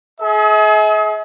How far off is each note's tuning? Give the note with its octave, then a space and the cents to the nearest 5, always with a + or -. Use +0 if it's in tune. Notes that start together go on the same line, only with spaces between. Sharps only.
G#4 +35 E5 -45